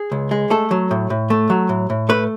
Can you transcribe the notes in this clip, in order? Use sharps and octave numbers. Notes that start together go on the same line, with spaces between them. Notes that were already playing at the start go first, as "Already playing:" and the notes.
Already playing: G#4
C#2
G#3
A3 A4
F#3
A2
A2
A3
F#3
A2
A2
A3 B4